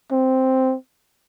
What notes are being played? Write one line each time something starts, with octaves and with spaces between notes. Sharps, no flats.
C4